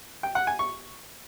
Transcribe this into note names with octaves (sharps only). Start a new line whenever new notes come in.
G5
F#5
G#5
C#6